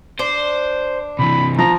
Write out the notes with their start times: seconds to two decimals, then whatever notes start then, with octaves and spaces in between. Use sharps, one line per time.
0.19 D4 C5
1.19 C3 E3 B5
1.59 F3 A#5